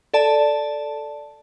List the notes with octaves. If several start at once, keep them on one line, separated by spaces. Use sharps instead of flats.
A4 D5 A5